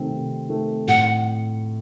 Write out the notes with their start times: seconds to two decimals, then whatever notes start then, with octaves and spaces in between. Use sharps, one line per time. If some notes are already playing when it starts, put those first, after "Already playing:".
Already playing: C3 D#3 A3 C4
0.11 C3
0.49 D#3 A3 C4
0.88 A2 F#5